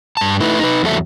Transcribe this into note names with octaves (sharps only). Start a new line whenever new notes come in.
G2 A5
A3 D#4 E4 B4
D#4 B4
E2 F#3 A4 E5